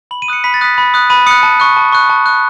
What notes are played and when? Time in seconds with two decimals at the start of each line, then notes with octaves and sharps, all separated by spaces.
0.11 B5 F#7
0.22 D#7
0.28 D#6 F#6 C#7
0.44 B5 B6
0.54 A6
0.61 D#6 F#6 B6
0.78 B5
0.94 D#6 F#6
1.10 B5 D#7
1.26 D#6 F#6 C#7
1.43 A5
1.60 C#6 F#6
1.76 A5
1.92 C#6 F#6
2.10 A5
2.26 C#6 F#6